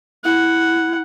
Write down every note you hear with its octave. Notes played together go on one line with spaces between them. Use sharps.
E4 F#5